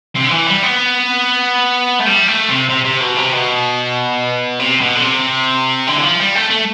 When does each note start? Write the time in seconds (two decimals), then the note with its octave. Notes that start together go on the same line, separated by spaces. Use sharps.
0.15 C3
0.24 D3
0.31 E3
0.47 G3
0.63 B3
2.00 A3
2.06 G3
2.27 A3
2.49 C3
2.69 C3
2.85 C3
3.01 B2
3.17 C3
3.33 B2
4.59 C3
4.81 B2
4.96 D3
5.02 C3
5.87 D3
5.97 E3
6.03 F3
6.20 G3
6.35 A3
6.50 A3